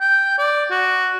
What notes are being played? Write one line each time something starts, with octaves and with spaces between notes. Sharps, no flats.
G5
D5
F#4